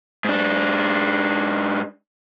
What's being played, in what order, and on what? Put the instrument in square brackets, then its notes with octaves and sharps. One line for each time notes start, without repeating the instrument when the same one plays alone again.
[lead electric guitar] G#2 D4